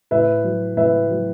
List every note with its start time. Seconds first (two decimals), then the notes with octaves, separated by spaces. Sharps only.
0.11 A2 B4 E5
0.44 F#3
0.77 A2 B4 E5
1.10 F#3